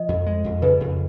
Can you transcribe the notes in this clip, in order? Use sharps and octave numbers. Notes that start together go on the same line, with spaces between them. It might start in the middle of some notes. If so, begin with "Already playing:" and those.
Already playing: F3 D#5
F2
G#3
F2
C#3 B4
F2